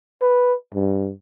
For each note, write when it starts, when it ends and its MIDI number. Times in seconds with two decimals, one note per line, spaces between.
0.22 0.54 71
0.75 1.11 43